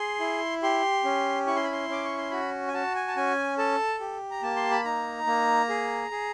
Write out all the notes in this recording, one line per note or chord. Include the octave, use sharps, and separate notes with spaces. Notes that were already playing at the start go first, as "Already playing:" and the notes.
Already playing: G#4 C6
E4
G4 C6
C#4
E4 C#6
C6
B5
C6
C#4 D6
C#6
C6
F#4 B5
G#5
F#4 A5
G#5
A5
C#4 G#5
A4 A5
G4
A#5
A#3 A5
C6
B5
D#4 A#5
A#3
G#4
G#4